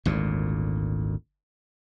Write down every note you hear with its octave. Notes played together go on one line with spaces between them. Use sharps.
G#1 D2 A#2